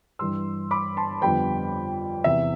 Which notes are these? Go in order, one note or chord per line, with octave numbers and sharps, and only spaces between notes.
G2 E3 G3 C6 E6
B5 D6
A5 C6
F2 D3 G3 B3 G5 B5
E2 C3 E3 B3 E5